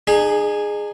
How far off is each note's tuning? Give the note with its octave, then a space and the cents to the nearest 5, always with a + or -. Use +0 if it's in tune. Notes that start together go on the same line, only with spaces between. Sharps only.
D#4 -45 G#4 +0